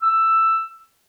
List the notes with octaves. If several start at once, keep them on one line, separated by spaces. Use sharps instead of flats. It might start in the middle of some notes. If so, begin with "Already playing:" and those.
E6